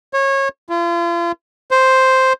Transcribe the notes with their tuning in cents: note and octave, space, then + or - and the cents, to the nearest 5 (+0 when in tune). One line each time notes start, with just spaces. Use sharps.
C#5 -25
F4 -40
C5 +0